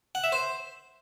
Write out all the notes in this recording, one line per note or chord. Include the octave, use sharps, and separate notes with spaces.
F#5
E5
C5